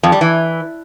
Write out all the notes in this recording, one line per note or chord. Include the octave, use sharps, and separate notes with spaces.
F2
G3
E3